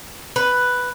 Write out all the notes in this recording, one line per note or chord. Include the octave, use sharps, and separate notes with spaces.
B4